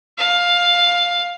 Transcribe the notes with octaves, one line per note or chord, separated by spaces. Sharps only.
F5